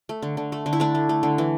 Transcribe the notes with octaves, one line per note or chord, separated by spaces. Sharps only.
A3
D3
D3
A3
D3
E4
A3 D4
A3
A3
D3
E3